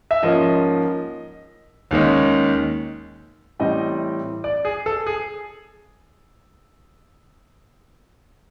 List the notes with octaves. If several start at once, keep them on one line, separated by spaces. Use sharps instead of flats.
E5
G#2 F3 A#3 C#4 D#5
D#2 D#3 G#3 C#4
A2 E3 G3 C4 D#5
D5
G#4
A4
G#4